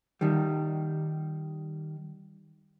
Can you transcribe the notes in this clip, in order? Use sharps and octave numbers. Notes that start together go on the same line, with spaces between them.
D#3 G3